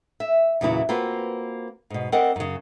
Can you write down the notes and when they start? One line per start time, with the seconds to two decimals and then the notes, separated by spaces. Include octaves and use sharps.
0.20 E5
0.61 E2 A#2 C#3 F#3 E4
0.89 A#3 C4 F4 F#4 B4
1.90 G#2 B2
2.12 C4 A#4 D5 D#5 F#5
2.36 F#2 C#3